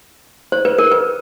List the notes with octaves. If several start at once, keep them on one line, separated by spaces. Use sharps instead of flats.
C5
B4
A#4
B4